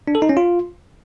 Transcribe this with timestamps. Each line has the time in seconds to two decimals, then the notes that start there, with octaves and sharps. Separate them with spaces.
0.08 D4
0.15 A4
0.22 D#4
0.29 C#4
0.37 F4